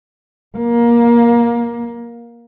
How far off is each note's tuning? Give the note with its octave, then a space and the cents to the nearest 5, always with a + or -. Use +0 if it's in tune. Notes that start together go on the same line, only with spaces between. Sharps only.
A#3 +20